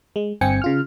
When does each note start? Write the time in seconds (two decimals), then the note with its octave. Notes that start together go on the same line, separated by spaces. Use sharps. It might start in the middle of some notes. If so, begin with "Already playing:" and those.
0.16 G#3
0.41 G1 G2 C4 G5 G#5 C#7
0.62 C#3 F4 F6